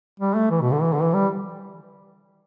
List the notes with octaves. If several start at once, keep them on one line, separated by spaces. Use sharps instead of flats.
G3
A3
E3
B2
D3
E3
D3
E3
G3